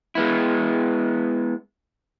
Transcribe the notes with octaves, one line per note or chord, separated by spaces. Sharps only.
G#3 B3 E4